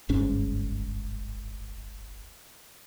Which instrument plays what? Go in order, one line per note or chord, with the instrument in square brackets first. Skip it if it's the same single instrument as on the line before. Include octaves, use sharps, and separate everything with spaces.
[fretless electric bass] D1 G1 G#2 C#4